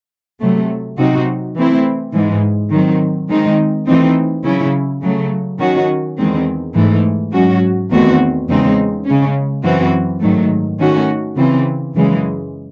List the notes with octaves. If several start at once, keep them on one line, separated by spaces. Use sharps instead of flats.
C3 F#3 A3
C3 F#3 C4 D#4 F#4
E3 A3 C4 E4
G#2 E3 G#3
D#3 F#3 C4
D#3 G#3 C4 D#4
E3 A3 C4 D#4
C#3 F#3 C#4 E4
C#3 F#3 A3
D#3 F#3 C#4 F#4
E2 D#3 G#3 C4
G#2 E3 A3
G#2 F#3 C#4 F#4
E2 D#3 A3 C4 F#4
E2 C#3 G#3 C4 D#4
C#3 G#3 C#4
F#2 E3 C4 F#4
G#2 D#3 F#3 A3
D#3 A3 C#4 F#4
C#3 E3 C4
F#2 C#3 E3 G#3